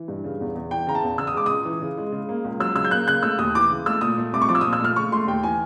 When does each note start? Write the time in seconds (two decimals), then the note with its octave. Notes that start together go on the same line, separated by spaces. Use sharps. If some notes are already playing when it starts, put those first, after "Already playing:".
Already playing: E3
0.08 G2
0.24 C#3
0.41 E2
0.55 E2
0.71 E3 G5
0.87 C#3 A#5
0.95 A5
1.03 E2
1.18 C#3 E6
1.27 D#6
1.35 G#3 D6
1.46 C#2 D#6
1.65 E3
1.82 C#3
1.98 G#3
2.12 C#3
2.29 A#3
2.44 C#2
2.60 F#3 E6
2.75 C#3 E6
2.85 G6
2.91 A#3 F#6
3.08 C#3 F#6
3.23 A3 E6
3.39 D#2 D#6
3.55 E3 D6
3.70 C#3
3.86 A3 E6
4.01 A#2 D#6
4.18 A3
4.33 C2 D6
4.42 C#6
4.49 F3 D6
4.55 E6
4.61 A#2 D#6
4.73 E6
4.81 A3 F6
4.96 C#3 C#6
5.12 A3 C6
5.27 D#2 G5
5.43 E3 G#5